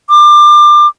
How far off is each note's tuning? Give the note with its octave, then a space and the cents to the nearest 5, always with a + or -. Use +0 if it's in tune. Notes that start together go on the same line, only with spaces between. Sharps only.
D6 +25